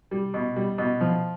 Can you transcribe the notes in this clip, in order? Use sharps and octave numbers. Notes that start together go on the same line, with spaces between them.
G3
B2
G3
B2
F3